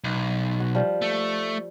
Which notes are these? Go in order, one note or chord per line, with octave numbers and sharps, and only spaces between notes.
B1
F#4
F3 G3
A3